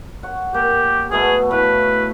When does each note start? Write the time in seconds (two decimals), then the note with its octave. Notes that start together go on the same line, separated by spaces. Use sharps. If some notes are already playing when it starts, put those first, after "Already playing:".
0.23 C#5 F#5
0.54 A#3 G4
1.11 B2 A3 B3 G#4
1.51 A2 B4 F5